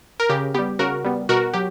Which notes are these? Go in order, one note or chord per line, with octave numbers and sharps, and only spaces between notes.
A#4
C#3 G4
G3 B3 G4
C#3 F#4 A#4
G3 B3
B2 F#4 A#4
F#3 G4